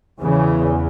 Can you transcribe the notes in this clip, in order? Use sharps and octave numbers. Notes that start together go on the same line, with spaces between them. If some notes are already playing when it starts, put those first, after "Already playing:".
E2 C#3 E3